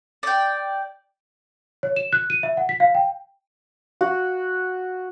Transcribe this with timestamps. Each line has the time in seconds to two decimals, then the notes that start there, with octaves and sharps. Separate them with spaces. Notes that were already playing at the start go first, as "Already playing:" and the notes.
0.23 D5 G5
1.83 C#5
1.96 E7
2.13 F#6
2.30 D#7
2.43 E5
2.57 F#5
2.69 B6
2.80 F5
2.95 G5
4.01 F#4